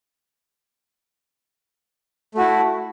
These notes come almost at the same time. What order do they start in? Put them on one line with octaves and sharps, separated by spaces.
A3 F#4 E4